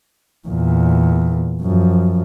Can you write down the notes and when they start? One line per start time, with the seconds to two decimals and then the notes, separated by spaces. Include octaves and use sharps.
0.48 E2 A#2
1.62 F#2 F3